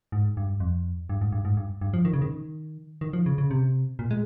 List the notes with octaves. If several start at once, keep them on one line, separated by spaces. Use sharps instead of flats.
G#2
G2
F2
G2
G#2
G2
G#2
G2
G2
F3
D#3
C#3
D#3
D#3
F3
C#3
C#3
C3
A#2
G#3